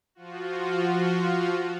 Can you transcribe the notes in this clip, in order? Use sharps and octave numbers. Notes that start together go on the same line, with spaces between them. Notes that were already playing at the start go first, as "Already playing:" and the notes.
F3 F4 F#4